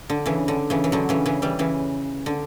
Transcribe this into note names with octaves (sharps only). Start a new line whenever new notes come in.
D3
C#3 E3
D3
C#3 E3
E3
D3 F#3
C#3 E3
C#3 E3
E3 G3
C#3 E3
D3